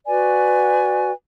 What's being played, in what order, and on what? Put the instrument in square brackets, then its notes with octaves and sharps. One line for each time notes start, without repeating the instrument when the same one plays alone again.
[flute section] F#4 B4 D5 G#5